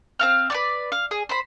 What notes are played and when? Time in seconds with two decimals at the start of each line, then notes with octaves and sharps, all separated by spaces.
0.19 C4 F5 F6
0.50 B4 C#5 D5
0.92 F5
1.11 G#4
1.29 C5 B5